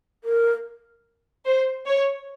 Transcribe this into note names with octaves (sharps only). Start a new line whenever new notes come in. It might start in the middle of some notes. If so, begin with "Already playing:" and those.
A#4
C5
C#5